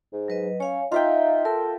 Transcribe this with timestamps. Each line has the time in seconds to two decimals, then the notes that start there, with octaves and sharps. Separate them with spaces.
0.13 G#2
0.28 F#3 B4 D#5
0.60 C#4 C#5 F5 G#5
0.92 D#4 F4 E5 F5 G5 A#5
1.45 A4 A#4